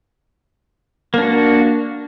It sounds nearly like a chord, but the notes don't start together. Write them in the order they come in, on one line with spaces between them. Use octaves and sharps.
A#3 D4 F#4